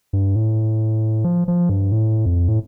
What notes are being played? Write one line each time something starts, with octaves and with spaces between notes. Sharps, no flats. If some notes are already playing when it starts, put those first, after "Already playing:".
G2
A2
F3
F3
G2
A2
F2
A2